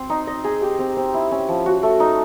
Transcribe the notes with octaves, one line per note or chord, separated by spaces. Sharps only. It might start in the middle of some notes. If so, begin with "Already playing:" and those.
Already playing: C4 C5
D#4
D#5
G#4
G4
C4
C4
E4
C#4
F3
F#4
A3
D#4